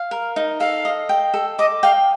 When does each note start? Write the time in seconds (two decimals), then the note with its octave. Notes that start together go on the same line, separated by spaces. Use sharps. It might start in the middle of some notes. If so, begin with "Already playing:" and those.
Already playing: F5
0.11 A#4
0.36 D#4
0.60 A4 F5
0.85 D#5
1.09 G5
1.34 A4
1.59 D#5 D6
1.83 F5 G5